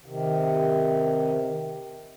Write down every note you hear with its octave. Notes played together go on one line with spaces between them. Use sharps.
C3 D#3